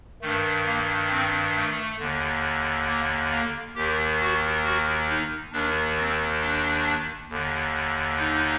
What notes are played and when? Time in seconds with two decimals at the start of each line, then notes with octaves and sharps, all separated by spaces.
0.22 G2 D#3 A3
0.66 A#3
1.10 C4
1.55 A3
1.99 D#2 D3
2.88 A#3
3.32 A#3
3.75 D#2 D#3 G4
4.20 F#4
4.64 F#4
5.09 D#4
5.52 D#2 D#3 D4
5.98 C4
6.41 D4
7.30 D#2 D3
8.19 D#4